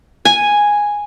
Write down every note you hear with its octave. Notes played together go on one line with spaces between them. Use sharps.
G#5